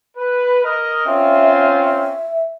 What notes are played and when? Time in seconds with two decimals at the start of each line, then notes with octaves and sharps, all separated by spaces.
0.16 B4
0.63 A#4 D#5
1.06 C4 C#4 F4 E5
1.85 E5